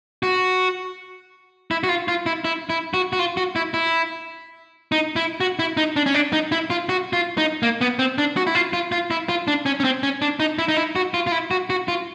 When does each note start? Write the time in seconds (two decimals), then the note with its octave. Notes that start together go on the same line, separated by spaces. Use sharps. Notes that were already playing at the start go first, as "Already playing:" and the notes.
0.23 F#4
1.71 E4
1.84 F#4
1.89 F4
2.08 F4
2.26 E4
2.45 E4
2.70 E4
2.94 F#4
3.13 F#4
3.19 F4
3.37 F#4
3.56 E4
3.74 E4
4.92 D#4
5.16 E4
5.40 F#4
5.59 E4
5.77 D#4
5.96 D4
6.06 C#4
6.14 D4
6.33 D#4
6.52 E4
6.70 F4
6.89 F#4
7.13 F4
7.38 D#4
7.63 A#3
7.81 B3
7.99 C4
8.18 D4
8.37 F#4
8.47 E4
8.55 F4
8.73 F4
8.92 F4
9.11 E4
9.29 F4
9.48 D4
9.66 C#4
9.80 C#4
9.84 C4
10.03 C#4
10.22 D4
10.40 D#4
10.59 E4
10.68 D#4
10.77 E4
10.96 F#4
11.14 F4
11.27 F4
11.32 E4
11.51 F#4
11.70 F#4
11.88 F4